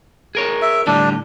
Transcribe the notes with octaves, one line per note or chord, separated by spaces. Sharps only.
G#4 A#4 C#5
E5
A2 D3 G3 D4